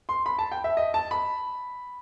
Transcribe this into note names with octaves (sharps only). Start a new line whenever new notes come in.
C6
B5
A5
G5
E5
D#5
A5
B5